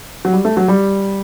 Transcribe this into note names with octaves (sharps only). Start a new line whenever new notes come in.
F#3
G3
A3
F#3
G3